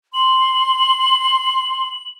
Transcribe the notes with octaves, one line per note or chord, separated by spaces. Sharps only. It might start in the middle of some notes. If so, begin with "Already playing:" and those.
C6 F#7